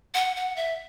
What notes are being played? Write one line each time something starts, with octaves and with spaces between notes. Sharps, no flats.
F#5
F#5
E5